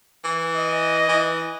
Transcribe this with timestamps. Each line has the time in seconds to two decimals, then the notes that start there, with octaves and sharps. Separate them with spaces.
0.24 E3
0.56 D#5
1.09 E3